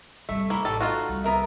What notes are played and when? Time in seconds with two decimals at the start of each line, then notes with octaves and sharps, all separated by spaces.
0.29 C3 G3 A3 E5
0.50 A#3 E4
0.65 A1 G3 A4
0.81 C#3 D#4 F4 F#4
1.09 C2
1.24 B3 A#4 E5